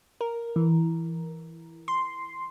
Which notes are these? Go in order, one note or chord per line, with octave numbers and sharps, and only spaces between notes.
A#4
E3
C6